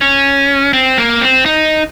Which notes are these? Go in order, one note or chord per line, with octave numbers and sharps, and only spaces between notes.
C#4
C4
A#3
C4
D#4